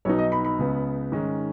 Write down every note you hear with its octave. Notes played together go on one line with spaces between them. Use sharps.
B1 B2 B3 D#4 C#5
D#5
B5
B5
C#2 C#3 B3
G#2 D#3 G#3 C#4